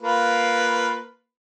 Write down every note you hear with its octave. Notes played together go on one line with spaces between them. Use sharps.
A#3 F4 B4